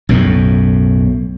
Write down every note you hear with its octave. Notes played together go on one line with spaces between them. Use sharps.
B1 F#2 A2